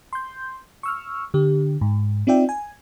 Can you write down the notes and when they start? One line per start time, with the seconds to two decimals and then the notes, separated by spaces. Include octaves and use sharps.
0.13 C6 G6
0.83 C#6 E6 F6
1.34 D3 G4
1.81 G#2
2.27 C4 D#4 F4 D5 E5 G5
2.49 G#5